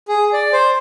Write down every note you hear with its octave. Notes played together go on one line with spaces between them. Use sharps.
G#4
D5
C5